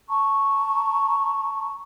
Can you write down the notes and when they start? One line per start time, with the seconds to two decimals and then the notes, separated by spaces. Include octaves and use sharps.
0.09 A5 A#5 C#6